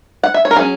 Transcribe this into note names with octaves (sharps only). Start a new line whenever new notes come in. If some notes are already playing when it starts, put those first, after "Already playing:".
F#5
E5
C#5
A#4
F#3 C#4 G#4